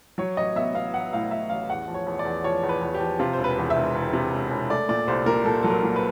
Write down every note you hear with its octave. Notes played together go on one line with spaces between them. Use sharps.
F#3 C#5
A1 D#5
B3 E5
B3 F5
A1 F#5
A2 F5
A2 E5
A1 F5
E2 F#5
F3
C#5
E2
D5
E2
F3 C#5
E2
B4
E2
G4
F3
C3 F4
E1 C5
B4
E2
E5
E1
E1
C3
E1
E1
A3 D5
A#2 D5
C2 C5
A#2 A#4
A#2 A4
F#3 A4
A#4
A#2
B4